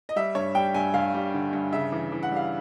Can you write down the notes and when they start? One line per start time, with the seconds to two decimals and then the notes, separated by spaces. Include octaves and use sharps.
0.09 D#5
0.16 G3 E5
0.35 G2 C#5
0.55 G3 G5
0.74 G2 G#5
0.94 G2 F5
1.14 G3
1.34 D3
1.53 G2
1.72 C#3 E5
1.92 E3
2.12 E3
2.23 F#5
2.31 G3
2.36 F5